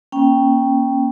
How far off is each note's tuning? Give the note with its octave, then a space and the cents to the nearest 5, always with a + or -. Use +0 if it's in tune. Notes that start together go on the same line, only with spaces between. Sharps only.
A#3 +30 C#4 -5 G5 +0